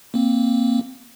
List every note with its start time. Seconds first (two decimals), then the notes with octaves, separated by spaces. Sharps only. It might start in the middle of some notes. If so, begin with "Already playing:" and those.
0.14 A#3 C4